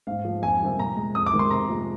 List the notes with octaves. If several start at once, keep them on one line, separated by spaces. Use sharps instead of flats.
G#2 F5
F3 G#3
F2 G#5
C3 D#3 G3
A#2 A#5
G#3
F2 D#6
D6
C3 D#3 G#3
C6
C3 A#5
F3 G#3